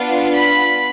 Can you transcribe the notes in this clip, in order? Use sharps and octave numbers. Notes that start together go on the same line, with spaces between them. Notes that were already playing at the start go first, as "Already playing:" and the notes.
Already playing: B3 D4 F4
B5